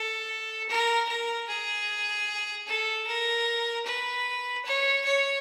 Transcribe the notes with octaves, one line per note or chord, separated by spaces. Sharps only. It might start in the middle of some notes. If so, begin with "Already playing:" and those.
Already playing: A4
A#4
A#4
G#4
A4
A#4
B4
C#5
C#5